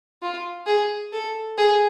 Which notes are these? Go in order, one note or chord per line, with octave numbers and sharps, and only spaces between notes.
F4
G#4
A4
G#4